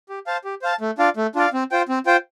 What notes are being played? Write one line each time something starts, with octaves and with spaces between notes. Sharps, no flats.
G4
C5 F5 A5
G4
C5 F5 A5
A3
D4 F4 D5 F5
A3
D4 F4 D5 F5
C4
F4 C5 G5
C4
F4 C5 G5